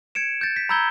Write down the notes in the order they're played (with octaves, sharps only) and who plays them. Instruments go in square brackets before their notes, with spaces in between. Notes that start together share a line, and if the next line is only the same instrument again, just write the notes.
[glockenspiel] G#6 C#7 D7 E7
G6 A6
B6
A#5 B5 E6 G6 G#6 G7